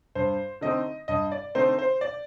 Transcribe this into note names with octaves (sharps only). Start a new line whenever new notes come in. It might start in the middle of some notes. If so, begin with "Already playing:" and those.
G2 C5
D3 A3 C4 D#4 D#5
G2 D#5
D5
D3 A3 C4 D#4 C5
C5
D5